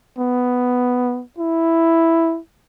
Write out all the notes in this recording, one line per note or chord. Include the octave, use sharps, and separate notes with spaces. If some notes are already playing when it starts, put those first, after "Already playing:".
B3
E4